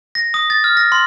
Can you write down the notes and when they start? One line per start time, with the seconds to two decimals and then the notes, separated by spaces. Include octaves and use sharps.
0.15 A#6
0.34 D#6
0.50 A6
0.64 F6
0.77 A#6
0.92 C6